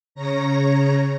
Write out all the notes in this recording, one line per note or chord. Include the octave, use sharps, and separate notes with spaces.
C#3 C#5 A#5 A#6